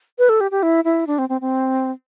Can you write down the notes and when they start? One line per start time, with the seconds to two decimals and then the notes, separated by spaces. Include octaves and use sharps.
0.19 B4
0.29 A4
0.41 G4
0.51 G4
0.63 E4
0.84 E4
1.07 D4
1.18 C4
1.29 C4
1.41 C4